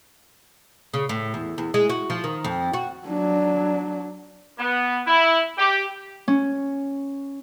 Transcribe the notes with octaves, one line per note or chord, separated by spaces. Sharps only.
C#3
A2
E2
E2
G#3
F#4
F3
D#3
F2
F#4
F#3 D4
B3
E4
G4
C#4